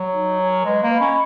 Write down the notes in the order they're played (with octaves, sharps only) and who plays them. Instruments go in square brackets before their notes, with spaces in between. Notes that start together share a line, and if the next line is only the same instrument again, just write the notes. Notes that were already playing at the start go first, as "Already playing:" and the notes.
Already playing: [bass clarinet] F#3
[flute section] D#4
A#4 C#5 G#5
[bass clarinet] G#3 [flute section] B4
[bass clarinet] A#3
[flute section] D#5 F#5 B5
[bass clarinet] C#4